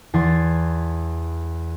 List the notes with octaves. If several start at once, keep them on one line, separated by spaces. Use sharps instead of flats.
E2 E3 A5 C6 G#6 A6